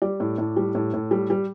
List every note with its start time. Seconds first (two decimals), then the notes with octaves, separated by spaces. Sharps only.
0.02 G3 D5
0.20 A2
0.38 A2
0.56 G3
0.75 A2
0.93 A2
1.11 G3
1.30 G3